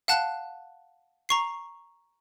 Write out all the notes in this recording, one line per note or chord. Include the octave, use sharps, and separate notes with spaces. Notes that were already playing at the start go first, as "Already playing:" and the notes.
F5 F#5 A5 F#6
A#5 C#6 C7